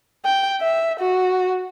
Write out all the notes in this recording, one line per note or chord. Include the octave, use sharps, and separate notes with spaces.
G5
E5
F#4